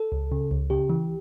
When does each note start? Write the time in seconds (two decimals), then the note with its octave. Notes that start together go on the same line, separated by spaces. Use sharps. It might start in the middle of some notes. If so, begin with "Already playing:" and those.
Already playing: A4
0.12 C#2
0.32 C#3
0.51 C#2
0.70 C#3 G4
0.89 E3